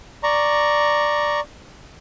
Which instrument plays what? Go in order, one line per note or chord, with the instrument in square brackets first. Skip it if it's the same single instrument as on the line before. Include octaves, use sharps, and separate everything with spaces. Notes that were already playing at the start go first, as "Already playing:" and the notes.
[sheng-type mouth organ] D5 A#5 C#6